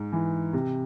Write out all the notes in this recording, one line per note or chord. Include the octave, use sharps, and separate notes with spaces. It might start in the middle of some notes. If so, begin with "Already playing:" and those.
Already playing: G#2
E3
C3